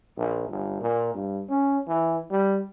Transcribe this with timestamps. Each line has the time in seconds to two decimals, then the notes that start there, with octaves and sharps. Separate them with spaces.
0.17 A#1
0.48 G1
0.81 A#2
1.14 G2
1.49 C#4
1.87 E3
2.31 G3